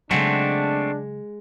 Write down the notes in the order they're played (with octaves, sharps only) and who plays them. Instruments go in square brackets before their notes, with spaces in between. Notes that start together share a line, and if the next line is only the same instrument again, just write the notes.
[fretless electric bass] C#3 F#3 [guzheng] G#3 F#5 [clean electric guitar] A3 C4 [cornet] D4